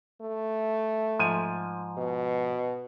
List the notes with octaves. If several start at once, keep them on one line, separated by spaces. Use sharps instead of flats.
A3
G#2 F3 G#5
B2